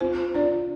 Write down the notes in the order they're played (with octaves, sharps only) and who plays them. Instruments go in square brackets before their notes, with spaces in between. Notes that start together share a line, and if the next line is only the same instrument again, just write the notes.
[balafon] C4 C5 [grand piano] F4
[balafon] D4 D5 [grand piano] F4